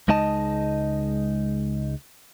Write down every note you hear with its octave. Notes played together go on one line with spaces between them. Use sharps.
C#2 G#3 D#4 D#5 A5